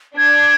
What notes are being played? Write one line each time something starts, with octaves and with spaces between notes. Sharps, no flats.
D4 G#6